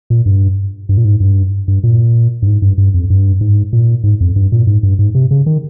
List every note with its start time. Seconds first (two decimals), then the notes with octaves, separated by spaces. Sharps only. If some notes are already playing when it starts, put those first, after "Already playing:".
0.10 A#2
0.26 G2
0.89 G2
0.97 A#2
1.05 G#2
1.20 G2
1.68 G2
1.83 A#2
2.42 G2
2.47 G#2
2.62 G2
2.78 G2
2.94 F2
3.10 G2
3.41 G#2
3.73 A#2
4.04 G#2
4.20 F2
4.36 G2
4.52 A#2
4.67 G#2
4.83 G2
4.99 G#2
5.15 C3
5.31 C#3
5.46 D#3